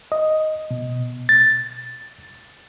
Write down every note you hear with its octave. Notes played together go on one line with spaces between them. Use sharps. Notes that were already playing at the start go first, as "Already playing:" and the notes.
D#5
B2
A6